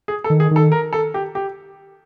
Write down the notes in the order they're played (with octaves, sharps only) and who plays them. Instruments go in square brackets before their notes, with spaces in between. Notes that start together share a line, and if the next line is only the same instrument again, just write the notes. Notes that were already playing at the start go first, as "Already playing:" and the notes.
[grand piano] G#4
A4
[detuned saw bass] D#3
[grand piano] G#4
[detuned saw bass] D#3 [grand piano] A4
[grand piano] A#4
A4
G4
G4